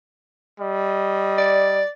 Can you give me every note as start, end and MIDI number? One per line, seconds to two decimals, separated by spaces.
0.59 1.80 55
0.59 1.80 75
1.38 1.88 74